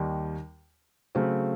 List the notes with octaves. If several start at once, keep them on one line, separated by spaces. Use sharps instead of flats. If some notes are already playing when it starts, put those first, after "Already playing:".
Already playing: D#2 D#3 G3
C#3 F#3 A3 C4